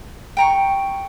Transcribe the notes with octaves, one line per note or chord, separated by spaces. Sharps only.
G5 A#5 C#6